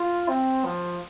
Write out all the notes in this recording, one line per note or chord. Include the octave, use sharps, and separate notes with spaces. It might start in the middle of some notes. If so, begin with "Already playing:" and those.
Already playing: F4
C4
F3